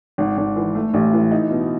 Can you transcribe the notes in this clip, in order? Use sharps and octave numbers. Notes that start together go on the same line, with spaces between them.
G#1
G#1
E3
A3
A1
E3
D#4
B2